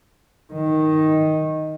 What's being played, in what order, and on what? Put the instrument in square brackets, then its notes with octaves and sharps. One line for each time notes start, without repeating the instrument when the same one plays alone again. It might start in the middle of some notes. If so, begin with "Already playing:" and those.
[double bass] D#3